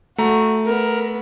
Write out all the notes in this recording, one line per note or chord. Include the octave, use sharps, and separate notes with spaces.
A3 F#4 A#5
B3 A#4